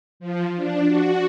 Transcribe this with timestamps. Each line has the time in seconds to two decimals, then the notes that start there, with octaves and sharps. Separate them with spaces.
0.20 F3
0.56 D4
0.87 F#4